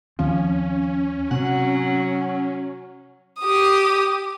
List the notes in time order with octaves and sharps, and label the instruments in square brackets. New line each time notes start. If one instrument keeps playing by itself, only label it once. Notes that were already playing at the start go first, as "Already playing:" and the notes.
[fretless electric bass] D#2 D#3 C4 [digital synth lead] F3 [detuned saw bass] C#4
[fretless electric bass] C3 C4 [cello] F#3 [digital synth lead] F#5
[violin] G4 D#6